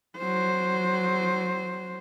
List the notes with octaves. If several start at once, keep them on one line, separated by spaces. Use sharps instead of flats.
F#3 C5